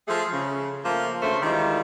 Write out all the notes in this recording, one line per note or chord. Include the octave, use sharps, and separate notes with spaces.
F3 A3 G#4
C#3
F3 A3 A#3
D2 C#3 A3 C5
D#3 E3 G3 G#3 F4